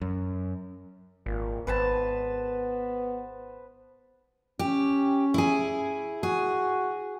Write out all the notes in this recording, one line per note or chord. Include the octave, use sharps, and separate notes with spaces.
F#2
G#1 A#2
G#1 B3 B4 C5 A5
C#4 G4
E4 G#4
F#4 G#4